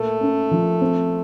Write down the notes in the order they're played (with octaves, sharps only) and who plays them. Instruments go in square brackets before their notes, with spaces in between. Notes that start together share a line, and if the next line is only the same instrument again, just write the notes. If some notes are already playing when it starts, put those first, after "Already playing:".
Already playing: [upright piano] A#2 A#3 [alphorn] A3
[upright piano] C#4
F3
C4